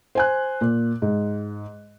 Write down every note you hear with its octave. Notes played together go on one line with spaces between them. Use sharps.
C5 G#5 F#6
A#2
G#2